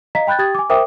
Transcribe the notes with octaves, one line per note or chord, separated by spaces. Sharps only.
D#5 F5 A#5 B6
G5 B5 F#6 G6 A6
G4 G5 D#6 G#6 A6
G#5 D6
A#4 C5 E5 G5 D6 D#6